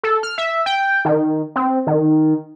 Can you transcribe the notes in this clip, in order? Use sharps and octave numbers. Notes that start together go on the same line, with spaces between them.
A4
F6
E5
G5
D#3
C4
D#3